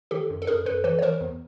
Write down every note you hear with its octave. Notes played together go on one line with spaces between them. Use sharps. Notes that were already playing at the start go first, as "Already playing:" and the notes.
D#3 G4 A4
F#2
A4
F#2 G#4 A#4
F#2 A4 B4
E3 A4 B4
C#5
E3 A#4 C5
E2